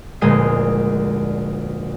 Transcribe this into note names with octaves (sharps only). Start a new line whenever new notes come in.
F1 D2 A#2 G#3 D#5 C7